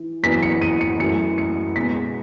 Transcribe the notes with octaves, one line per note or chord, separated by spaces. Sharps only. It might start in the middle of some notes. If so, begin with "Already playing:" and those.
Already playing: E3
F#2 E3 B3 B6
C#7
D#7
C#7
F#2 E3 A3 C#7
C#7
B2 G#3 B3 B6